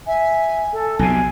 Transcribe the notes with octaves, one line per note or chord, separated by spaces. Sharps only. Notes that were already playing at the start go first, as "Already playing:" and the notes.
E5 G#5
A4
B1 C3 G#5